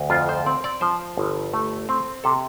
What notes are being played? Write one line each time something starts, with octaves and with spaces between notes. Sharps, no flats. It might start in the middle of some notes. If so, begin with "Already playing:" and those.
Already playing: D2
F2 F4
C5
C4 D5
D5
F3 C5
G1
A3
C4
C3 A4